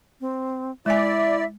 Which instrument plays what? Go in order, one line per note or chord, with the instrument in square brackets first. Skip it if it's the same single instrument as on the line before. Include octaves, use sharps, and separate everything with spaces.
[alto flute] C4
[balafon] G#3 G#5 [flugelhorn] E4 [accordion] D5 [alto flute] E5